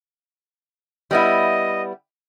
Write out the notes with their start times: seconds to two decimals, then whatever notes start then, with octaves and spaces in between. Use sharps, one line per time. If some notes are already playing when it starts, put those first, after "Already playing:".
1.11 G3 B3 E4 D#5